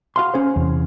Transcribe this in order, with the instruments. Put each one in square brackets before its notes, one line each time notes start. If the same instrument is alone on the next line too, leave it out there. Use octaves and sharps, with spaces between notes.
[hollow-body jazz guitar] F#4 F5 C6
C#4 G#4 C5
[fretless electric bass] E2 C3